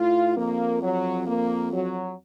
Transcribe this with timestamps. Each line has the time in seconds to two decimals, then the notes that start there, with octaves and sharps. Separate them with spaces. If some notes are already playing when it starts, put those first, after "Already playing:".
Already playing: A2 F4
0.37 F2 A#3
0.82 F#3
1.27 A#3
1.73 F#3